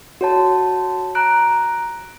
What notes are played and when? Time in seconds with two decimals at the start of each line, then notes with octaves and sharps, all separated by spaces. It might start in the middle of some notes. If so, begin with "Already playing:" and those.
0.21 F#4 C#5 A5
1.15 A#5 F#6 D7